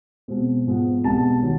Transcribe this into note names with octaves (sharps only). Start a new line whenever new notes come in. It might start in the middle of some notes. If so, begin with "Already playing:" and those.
B2 G#3 C4
G#2 F3 G#3 B3
C2 B2 G#3 B3 D4 A5
D#3 F#3